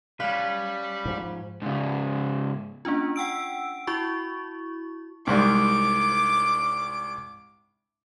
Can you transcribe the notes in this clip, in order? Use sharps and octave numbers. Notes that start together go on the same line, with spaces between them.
G3 C#4 B4 F5
G#2 F3
G#2 C#3
A#3 C#4 D4 F4
F#5 G5 E6 D7
E4 F#4 C#6
C2 G#2 G3 D6